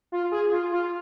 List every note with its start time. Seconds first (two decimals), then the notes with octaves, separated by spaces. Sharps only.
0.12 F4
0.32 G#4
0.52 F4
0.72 F4